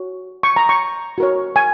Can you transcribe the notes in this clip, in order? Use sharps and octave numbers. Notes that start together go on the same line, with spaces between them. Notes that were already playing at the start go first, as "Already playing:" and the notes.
Already playing: F#4 C#5
C#6
A#5
C#6
F#4 A#4 C#5
G#5